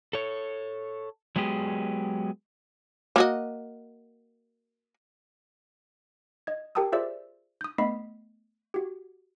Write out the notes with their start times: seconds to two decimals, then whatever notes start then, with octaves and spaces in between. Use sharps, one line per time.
0.13 A4 C#5
1.36 F#3 G#3 B3 G4 G#4
3.16 A#3 F#4 D#5
6.47 D#5 G#6
6.75 G4 A#4 G5 A5 D#6 E6
6.92 F4 G#4 C5 D5 E5 E6
7.61 D#6 G6
7.78 A3 B3 D#5 B5 B6 C7
8.74 F#4 G4